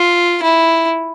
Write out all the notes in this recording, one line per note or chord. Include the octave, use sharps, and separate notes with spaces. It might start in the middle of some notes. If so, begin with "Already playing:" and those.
Already playing: F4
E4